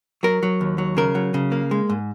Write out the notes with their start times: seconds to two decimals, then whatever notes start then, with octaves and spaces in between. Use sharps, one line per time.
0.23 F#3 A#4
0.43 F#3
0.61 D#2
0.78 F#3
0.97 C#3 A#4
1.15 F#3
1.34 C#3
1.52 A#3
1.71 G#3
1.89 G#2